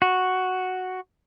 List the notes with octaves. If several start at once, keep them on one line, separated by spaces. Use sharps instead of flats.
F#4